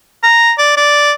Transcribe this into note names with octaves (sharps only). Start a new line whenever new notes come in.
A#5
D5
D5